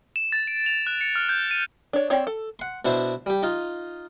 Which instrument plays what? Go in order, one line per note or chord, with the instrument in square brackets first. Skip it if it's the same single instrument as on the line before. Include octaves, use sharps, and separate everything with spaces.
[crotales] E7
A6
D7
F7
F#6
C#7
F6
G6
D#7
[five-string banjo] D4 C#5
C4 C#5 D5
A4
[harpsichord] F#5 C6
B2 D4 E4 C5
G3 G4
D#4 F4